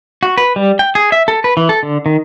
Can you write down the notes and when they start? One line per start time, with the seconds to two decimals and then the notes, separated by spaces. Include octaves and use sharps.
0.23 F#4
0.38 B4
0.56 G3
0.79 G5
0.95 G#4
1.12 E5
1.28 A4
1.44 B4
1.57 E3
1.69 A4
1.83 D3
2.06 D#3